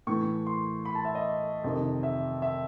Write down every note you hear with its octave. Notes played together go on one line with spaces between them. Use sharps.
A2 E3 A3 C#6
C6
B5
A5
E5
D#5
F2 C3 D#3
E5
E5